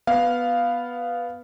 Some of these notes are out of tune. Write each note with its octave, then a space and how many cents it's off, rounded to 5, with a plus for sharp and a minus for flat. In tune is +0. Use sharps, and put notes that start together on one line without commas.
B3 +0 F5 +0